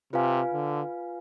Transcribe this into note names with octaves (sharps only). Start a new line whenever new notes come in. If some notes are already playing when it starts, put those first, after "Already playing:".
C3 F4 B4 F5 G#5
D3